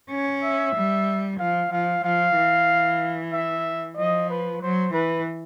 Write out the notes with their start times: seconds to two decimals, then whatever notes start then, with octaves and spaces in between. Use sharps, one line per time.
0.10 C#4
0.43 E5
0.75 G3
1.39 F3 F5
1.71 F3 F5
2.04 F3 F5
2.36 E3
3.33 E5
3.97 F3 D#5
4.30 B4
4.62 F#3 C5
4.93 E3 B4